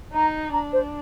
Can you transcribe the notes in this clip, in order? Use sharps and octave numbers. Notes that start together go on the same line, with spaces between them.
D#4 A#5
D4 A#5
C5